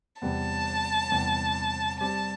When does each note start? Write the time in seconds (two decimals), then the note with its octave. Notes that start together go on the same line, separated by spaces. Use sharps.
0.22 E2 C3 G3 B3 A5
1.11 E2 C3 G3 B3
2.00 G3 C4 G4 A5